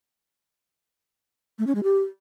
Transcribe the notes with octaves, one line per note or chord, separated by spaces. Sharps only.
A3
C#4
G#3
G4